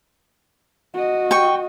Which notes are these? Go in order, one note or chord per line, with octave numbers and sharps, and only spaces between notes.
F#4 D#5
G5 C#6